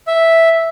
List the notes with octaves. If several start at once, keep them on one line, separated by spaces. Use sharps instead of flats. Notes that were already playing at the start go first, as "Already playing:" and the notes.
E5